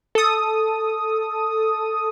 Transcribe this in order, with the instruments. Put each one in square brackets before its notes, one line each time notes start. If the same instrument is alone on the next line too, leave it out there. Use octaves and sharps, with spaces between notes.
[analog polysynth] A4 D#6